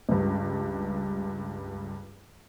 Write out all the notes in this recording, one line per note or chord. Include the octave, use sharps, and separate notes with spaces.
C#2 G2